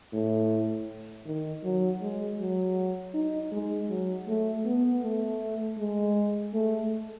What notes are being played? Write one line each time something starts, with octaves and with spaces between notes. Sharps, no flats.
A2
D#3
F#3
G#3
F#3
D#4
G#3
F#3
A3
B3
A3
G#3
A3